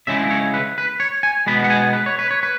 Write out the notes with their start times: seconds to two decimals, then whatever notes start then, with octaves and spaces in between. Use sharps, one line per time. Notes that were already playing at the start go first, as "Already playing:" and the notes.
0.07 C#3 G#3 E4 E5
0.30 C#5
0.54 B4
0.78 B4
1.00 C#5
1.23 G#5
1.47 B2 G#3 B3 B5
1.64 F#5
1.70 G#5
1.93 B4
2.06 C#5
2.19 B4
2.31 C#5
2.43 B4